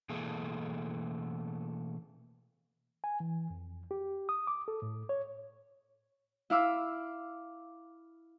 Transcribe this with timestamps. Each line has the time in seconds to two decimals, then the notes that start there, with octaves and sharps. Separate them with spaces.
0.09 B2 E3 A3 A#3 G#4 A4
3.04 G#5
3.20 E3
3.50 F2
3.91 G4
4.29 D#6
4.47 D6
4.68 A4
4.82 A2
5.09 C#5
6.50 E4 F5 D6 E6